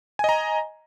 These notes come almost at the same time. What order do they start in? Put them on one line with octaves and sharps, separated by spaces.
G#5 D#5 A#5